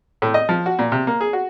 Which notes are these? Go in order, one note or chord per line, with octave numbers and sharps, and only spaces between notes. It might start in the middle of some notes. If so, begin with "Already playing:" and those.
A2
D#5
F3
F#4
A#2
C3
A#3
G#4
F#4